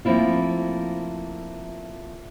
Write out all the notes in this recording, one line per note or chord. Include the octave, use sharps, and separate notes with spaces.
F3 A3 A#3 C4 E4 F4